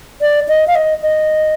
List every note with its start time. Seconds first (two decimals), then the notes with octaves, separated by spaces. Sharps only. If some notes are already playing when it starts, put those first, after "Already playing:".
0.21 D5
0.49 D#5
0.68 F5
0.75 D#5
1.02 D#5